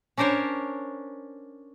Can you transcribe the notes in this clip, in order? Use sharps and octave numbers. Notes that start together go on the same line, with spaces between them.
C#4 D4 A#4 C5 C#5